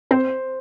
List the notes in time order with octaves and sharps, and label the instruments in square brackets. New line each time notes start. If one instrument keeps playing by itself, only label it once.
[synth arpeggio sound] C4 [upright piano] C5